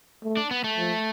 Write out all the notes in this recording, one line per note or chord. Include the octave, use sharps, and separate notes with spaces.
A3
D4
B3
A3
F3